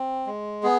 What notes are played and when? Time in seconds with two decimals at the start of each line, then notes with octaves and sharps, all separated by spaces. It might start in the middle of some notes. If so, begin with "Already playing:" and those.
Already playing: C4
0.27 G#3
0.63 B3 G#4